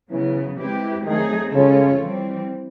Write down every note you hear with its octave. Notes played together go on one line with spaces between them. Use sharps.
C#3 E3 F#3 B3
G#3 C4 E4 G4 B4
D#3 F#3 A3 C4 D#4 G#4
C#3 G#3 C#4 F4 A4 C#5
E3 G3 C4